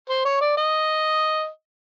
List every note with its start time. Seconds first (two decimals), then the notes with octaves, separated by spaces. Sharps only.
0.09 C5
0.25 C#5
0.41 D5
0.57 D#5